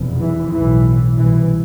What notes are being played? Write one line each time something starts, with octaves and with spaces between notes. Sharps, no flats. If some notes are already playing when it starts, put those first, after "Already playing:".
Already playing: F1 E2 B2
E3
B1 A2 E3
C2 B2 E3